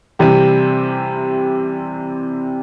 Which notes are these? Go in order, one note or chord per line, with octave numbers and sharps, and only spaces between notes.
C3 E3 G3 C4 G4